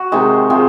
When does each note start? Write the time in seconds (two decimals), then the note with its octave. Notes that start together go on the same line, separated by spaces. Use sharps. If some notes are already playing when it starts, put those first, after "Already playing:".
Already playing: F#4
0.12 C3 D#3 G#3
0.50 C3 F3 G#3